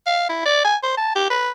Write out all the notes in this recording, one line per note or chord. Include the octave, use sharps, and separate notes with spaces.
F5
E4
D5
G#5
C5
A5
G4
B4